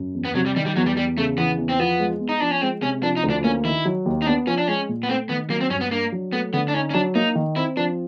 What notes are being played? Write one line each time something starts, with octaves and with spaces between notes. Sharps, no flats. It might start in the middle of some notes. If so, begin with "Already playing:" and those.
Already playing: F#2
E2
B3
C3 F#3
G3
D#3 G3
G3
E2 F#3
G3
E2 G3
C#3 A3
E3 B3
E2
C4
F3 B3
G#3
B3
D#4
F3 D4
C#4
G#3 C4
C3 C#4
F3 D4
D#4
D2
D4
A#3 C#4
D#3 E4
F#3
D#2
D#4
B3 D4
F3 C#4
D4
G#3 C#4
A#2
B3
A3 C4
D#3 B3
F#3 A#3
C4
G2 C#4
B3
A#3 D4
F#3
A3 B3
D3 B3
D4
C#4 D#4
C#4
F#3 D4
A#3 D#4
D#3
C4 E4
F3 D4